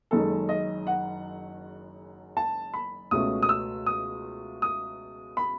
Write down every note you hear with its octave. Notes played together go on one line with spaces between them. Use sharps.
F#1 F#2 D#3 G#3 A4
D#5
F#5
A5
B5
C#2 B2 A3 C#4 D#6
D#6
E6
D#6
D#6
B5